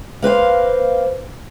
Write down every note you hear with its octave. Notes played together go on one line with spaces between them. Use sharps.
A#3 B4 C5 F5